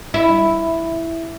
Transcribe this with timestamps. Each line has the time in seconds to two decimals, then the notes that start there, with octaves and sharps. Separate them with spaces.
0.14 E4